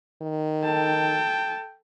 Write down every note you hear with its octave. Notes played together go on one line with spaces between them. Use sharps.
D#3
A4 G5 A5